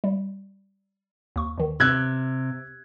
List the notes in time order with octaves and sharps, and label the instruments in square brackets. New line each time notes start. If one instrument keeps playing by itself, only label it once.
[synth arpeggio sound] G3
D#2 C#6
D#2 D#3
[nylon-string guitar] C3 [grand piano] E6 F#6 G#6